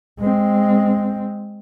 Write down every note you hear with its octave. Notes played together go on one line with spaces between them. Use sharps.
G#3 C4